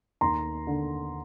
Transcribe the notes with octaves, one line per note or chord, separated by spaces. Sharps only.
D#2 A#5 C6
D3